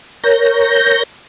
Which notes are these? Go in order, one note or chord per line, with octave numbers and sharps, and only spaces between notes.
A#4 C#5 G6 A#6